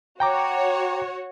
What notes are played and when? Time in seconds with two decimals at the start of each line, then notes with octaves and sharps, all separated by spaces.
0.20 F#4 C#5 G5 A#5 D6